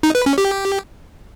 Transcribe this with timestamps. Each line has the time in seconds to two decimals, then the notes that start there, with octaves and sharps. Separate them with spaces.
0.03 D#4
0.15 B4
0.26 C#4
0.38 G4